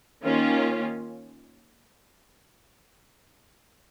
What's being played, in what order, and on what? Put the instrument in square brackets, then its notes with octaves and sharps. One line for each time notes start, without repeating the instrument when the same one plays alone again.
[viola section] D#3 A#3 C#4 F4